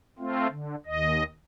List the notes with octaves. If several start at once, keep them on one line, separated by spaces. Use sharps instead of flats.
A3 C4 F4
D3
D#2 D#5